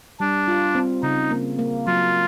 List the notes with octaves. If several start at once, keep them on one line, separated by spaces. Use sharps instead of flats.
G3 D4
F4
C4
C#3 D#4
A#3
A#3
F#3 F4